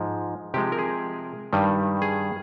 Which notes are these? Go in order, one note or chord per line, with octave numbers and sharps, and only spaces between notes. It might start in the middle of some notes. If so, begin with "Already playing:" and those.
Already playing: G#2 F3 G#3
C3 F3 G#3 G4
A#4
G#4
G2 D#3 G3
G#4